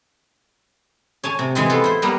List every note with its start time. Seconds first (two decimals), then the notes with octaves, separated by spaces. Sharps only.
1.24 C#5 G#5 A5
1.39 C3
1.55 E3 G#3 C4
1.70 B3 F4 A4
1.84 E4 C5
2.02 G3 A#3 B3